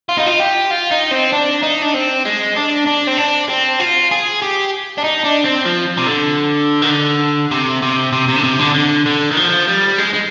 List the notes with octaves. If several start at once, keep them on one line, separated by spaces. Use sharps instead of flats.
F4
D#4
F4
G4
F4
D#4
C4
D4
D#4
D4
C4
G#3
D4
D4
C4
D4
C4
F4
G#4
G4
D4
D#4
D4
C4
F3
C3
D3
D#3
D3
C3
C3
C3
C3
D3
C3
D3
D3
D3
D#3
F3
G3
G#3
G#3